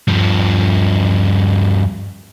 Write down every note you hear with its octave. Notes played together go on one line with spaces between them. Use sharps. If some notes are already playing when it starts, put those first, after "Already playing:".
G2 F3